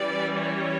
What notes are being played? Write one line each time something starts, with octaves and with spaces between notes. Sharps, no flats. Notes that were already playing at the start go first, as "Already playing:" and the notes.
Already playing: E3 G3 C#4 D5
C#5